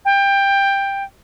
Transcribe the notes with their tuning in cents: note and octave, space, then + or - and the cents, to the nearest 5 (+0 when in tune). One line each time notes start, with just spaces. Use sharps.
G5 +15